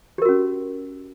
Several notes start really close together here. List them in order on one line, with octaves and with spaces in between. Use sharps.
G4 A#4 F#4 C#4